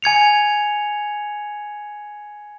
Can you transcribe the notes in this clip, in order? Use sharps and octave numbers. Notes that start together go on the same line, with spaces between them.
G#5 G#6 C#7 F7